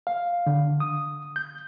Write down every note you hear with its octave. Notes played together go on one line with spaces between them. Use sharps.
F5
D3
D#6
G6